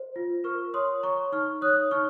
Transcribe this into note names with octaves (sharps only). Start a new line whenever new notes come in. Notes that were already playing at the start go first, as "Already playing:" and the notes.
Already playing: C5
F4
A#4 C#6 F6
C#5 C6 D#6
C#5 A#5 C#6
D#4 C#6 F6
C#5 D#6 F#6
D#4 C#6 F6